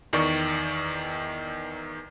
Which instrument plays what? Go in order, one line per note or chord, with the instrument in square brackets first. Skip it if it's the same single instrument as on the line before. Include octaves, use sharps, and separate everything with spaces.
[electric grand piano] E2 D#3 D5 C#6